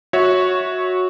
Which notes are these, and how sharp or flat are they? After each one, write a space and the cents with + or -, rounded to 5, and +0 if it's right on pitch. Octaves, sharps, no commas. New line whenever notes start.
F#4 -15 C#5 +0 E5 -20